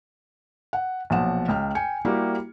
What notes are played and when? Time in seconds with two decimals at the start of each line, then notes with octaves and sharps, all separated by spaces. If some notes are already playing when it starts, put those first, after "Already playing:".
0.73 F#5
1.10 B1 A#2 F3 F#5 E7
1.48 C#2 G5 F6
1.75 G5 G#5 C#7
2.05 G3 A#3 E4 F#4 G4